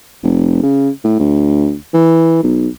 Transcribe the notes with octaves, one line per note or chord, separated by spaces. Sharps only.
F1
C#3
A2
D2
E3
B1